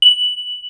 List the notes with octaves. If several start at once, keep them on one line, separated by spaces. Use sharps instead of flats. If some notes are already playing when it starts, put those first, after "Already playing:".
F#7